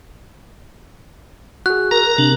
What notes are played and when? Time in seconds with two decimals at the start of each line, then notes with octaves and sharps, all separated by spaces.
1.66 F#4 G#4 F#6
1.91 A#4 A#5
2.18 C3 D4